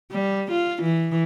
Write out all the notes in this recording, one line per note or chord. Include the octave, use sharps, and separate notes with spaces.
G3
F4
E3